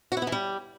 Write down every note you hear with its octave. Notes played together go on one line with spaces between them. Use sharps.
F#4
E4
B3
E3
G3